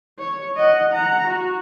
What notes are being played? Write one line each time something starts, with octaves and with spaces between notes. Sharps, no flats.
C#5
D#5 F#5
F#5 A#5
F#4